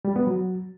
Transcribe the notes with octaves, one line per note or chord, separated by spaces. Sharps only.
G3
B3
F#3